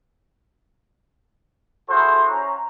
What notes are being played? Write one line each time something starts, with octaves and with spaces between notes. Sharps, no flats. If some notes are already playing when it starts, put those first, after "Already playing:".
E4 F#4 G#4 A4 C5
C#4 A#5